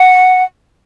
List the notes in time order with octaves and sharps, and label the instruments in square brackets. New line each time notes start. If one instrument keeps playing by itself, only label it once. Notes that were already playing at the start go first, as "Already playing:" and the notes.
Already playing: [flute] F#5